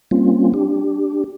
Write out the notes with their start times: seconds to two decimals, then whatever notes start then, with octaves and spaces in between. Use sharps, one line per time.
0.11 G3 A#3 C4 C#4 F4
0.54 D4 G4